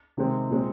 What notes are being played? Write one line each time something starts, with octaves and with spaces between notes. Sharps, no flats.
C3 D#3 G#3 C4 G4
A#2 G#3 C4